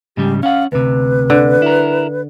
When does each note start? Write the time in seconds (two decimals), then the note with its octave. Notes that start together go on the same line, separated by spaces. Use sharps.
0.17 G#2 C#3 G3 G4
0.43 C#4 F5 F#5
0.72 D2 C3 B4
1.30 D3
1.62 E4 A#4